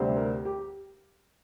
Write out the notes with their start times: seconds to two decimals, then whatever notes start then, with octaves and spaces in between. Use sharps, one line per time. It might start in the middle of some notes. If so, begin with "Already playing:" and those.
Already playing: D2 C3 G3 C4
0.17 A#4
0.45 G4